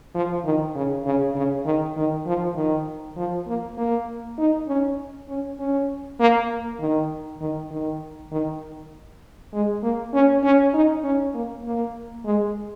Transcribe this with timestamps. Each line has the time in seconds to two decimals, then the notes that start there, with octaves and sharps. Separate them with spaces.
0.15 F3
0.45 D#3
0.75 C#3
1.06 C#3
1.35 C#3
1.66 D#3
1.97 D#3
2.26 F3
2.56 D#3
3.17 F3
3.47 A#3
3.77 A#3
4.38 D#4
4.68 C#4
5.28 C#4
5.59 C#4
6.20 A#3
6.80 D#3
7.41 D#3
7.71 D#3
8.32 D#3
9.53 G#3
9.83 A#3
10.14 C#4
10.43 C#4
10.74 D#4
11.03 C#4
11.34 A#3
11.65 A#3
12.25 G#3